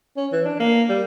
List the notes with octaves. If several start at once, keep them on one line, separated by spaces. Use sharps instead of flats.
C#4
E3
D4
A#3
G3